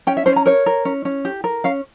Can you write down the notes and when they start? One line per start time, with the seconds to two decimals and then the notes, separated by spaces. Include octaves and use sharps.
0.07 C#4 G5
0.17 E5
0.26 C#4 C5
0.36 A#5
0.46 A#4 C#5
0.66 A#4
0.85 C#4
1.05 C#4
1.25 G4
1.44 A#4
1.64 C#4 F5